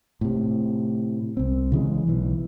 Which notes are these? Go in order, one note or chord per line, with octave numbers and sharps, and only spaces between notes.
A2 C3
C2 C4
C#3 E3 G#3
B1 E3